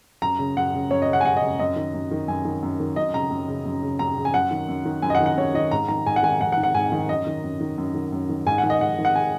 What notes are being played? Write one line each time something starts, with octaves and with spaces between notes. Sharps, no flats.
F#2 A#5
C#3
F#2 F#5
C#3
F#2 C#5
D#5
C#3
F#5
G#5
F#2 F#5
D#5
C#3
F#2 D#5
D#3
F#2
D#3
F#2 G#5
D#3
F#2
D#3
F#2 D#5
C#3 A#5
F#2
C#3
F#2
C#3
F#2 A#5
C#3
G#5
F#2 F#5
D#3
F#2
D#3
F#2 G#5
D#5
F#5
D#3
F#5
F#2 C#5
D#3 D#5
G#2 A#5
D#3 A#5
G#2 G#5
F#5
D#3 G#5
G#2 F#5
F#5
D#3
F#5
G#2 G#5
D#3
F#2 D#5
D#3
F#2
D#3
F#2
D#3
F#2
D#3
G#2 G#5
F#5
D#3
D#5
G#2 F#5
D#3
F#5
G#5